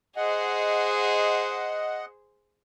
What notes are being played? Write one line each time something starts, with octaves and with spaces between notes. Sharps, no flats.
G#4 C5 D#5 F#5